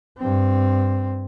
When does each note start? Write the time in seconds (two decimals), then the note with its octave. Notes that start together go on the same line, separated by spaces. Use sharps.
0.18 G2 C4